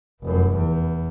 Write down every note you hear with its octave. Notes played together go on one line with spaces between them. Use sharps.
F1 F#2
E2